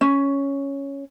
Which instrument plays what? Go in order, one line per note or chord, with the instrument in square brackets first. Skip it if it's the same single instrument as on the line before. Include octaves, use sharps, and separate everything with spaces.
[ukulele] C#4